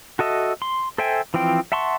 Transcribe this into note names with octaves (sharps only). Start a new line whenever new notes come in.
F#4 A4 D#5 E5
C6
A4 C5 E5 G5 G#5
E3 F3 C4 G5
E5 F#5 A5 C6 C#6